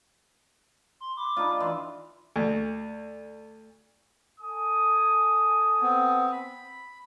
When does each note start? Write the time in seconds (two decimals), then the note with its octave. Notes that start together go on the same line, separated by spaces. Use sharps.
1.00 C6
1.17 B5 D6
1.37 D4 D#4 F4
1.60 E3 C6
2.36 D2
4.40 A4 G#5 D#6
5.81 B3 C4
6.32 B5